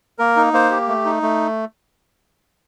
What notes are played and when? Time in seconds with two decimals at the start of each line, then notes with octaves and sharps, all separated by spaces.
0.19 A#3 A#4
0.36 D#4
0.53 A#3 C5
0.71 G4
0.88 A3
1.05 D#4
1.23 A3